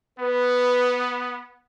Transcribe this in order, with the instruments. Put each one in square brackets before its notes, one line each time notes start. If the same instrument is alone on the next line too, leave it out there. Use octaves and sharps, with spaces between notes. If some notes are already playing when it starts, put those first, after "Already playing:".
[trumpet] B3 [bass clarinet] B4